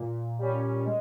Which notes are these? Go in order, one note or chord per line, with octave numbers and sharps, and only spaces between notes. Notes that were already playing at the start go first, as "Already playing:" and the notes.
Already playing: A#2
G3 C#4
G#3